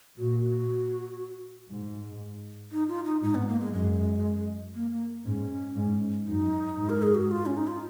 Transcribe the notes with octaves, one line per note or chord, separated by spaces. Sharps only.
A#2 F#4
F#4
G#2
D#4
F4
D#4
G#2 D#4
B3
A#3
G#3
F#2 G#3
A#3
A#3
G#2 C#4
G#2
F#2 D#4
G#2
A#4
G#4
F#4
F#4
F4
C#4
D#4
F4